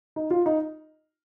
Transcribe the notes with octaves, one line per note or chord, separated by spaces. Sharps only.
D#4
F4
D#4